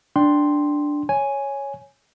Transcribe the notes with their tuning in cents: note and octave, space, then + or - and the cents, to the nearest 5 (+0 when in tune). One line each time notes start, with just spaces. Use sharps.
D4 +0 G5 +0 C6 +0
C#5 +0 G#5 +0